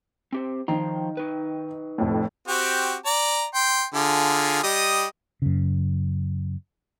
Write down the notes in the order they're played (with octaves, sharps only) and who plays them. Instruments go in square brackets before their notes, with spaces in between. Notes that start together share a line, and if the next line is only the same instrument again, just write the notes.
[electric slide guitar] C4 G4 C5
[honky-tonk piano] D#3 [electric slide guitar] F3 C5 A#5
[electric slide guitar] D#4 B4
[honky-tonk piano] F1 F2 A2
[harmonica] C4 F#4 G4
D5 A#5
G5 C6
D3 F4 G#4
G3 D#5 D#6
[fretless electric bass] F#2 C#3